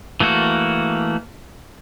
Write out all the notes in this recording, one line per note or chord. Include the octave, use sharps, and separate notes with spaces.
E3 A3 A#3 F#4